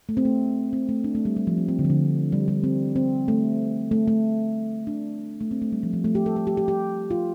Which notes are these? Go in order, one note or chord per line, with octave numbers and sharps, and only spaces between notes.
A3
C4
A3
C4
A3
D4
A3
G3
G3
F3
C4
C4
D3
F3
D3
G3
G3
C4
C4
A3
A3
A3
D4
A3
C4
A3
G3
F3
F3
A3
G4
A4
A4
G4
G4
G4
F4